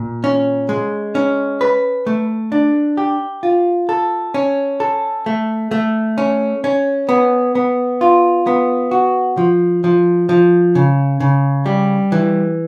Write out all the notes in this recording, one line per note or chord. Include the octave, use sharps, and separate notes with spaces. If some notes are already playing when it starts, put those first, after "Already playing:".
Already playing: A#2
C#4
G#3
C#4
B4
A3
D4
G4
F4
A4
C#4
A4
A3
A3
C#4
C#4
B3
B3
F4
B3
F#4
F3
F3
F3
C#3
C#3
G3
E3